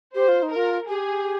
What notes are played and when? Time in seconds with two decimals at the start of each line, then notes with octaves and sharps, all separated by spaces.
0.15 G4 C5
0.28 F4
0.43 D#4
0.51 F4 A#4
0.88 G4 G#4